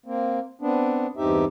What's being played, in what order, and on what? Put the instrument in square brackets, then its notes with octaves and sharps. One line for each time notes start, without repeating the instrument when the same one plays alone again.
[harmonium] A#3 C4
B3 C4 D4
E2 G2 C4 D#4 G4 E5